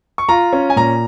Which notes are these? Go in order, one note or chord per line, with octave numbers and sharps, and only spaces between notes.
C#6
F4 A#5
C#4
G#5
A#2 A#5